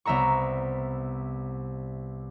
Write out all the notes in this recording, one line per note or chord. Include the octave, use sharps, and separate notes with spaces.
C2 B3 E5 A#5 C#6